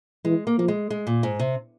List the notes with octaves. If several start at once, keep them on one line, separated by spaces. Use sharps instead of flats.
E3 G#3
A#3
F3 A#3
G#3
G#3
A#2
G#2
C3